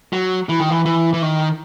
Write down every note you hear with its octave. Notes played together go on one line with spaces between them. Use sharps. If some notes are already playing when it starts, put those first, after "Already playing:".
F#3
E3
D#3
E3
E3
E3
D#3